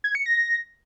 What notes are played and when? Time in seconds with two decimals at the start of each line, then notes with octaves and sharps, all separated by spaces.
0.04 G#6
0.15 C#7
0.26 A#6